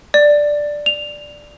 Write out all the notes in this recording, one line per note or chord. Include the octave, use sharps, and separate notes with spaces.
D5
F7